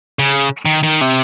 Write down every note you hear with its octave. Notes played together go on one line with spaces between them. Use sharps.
C#3
D#3
D#3
C3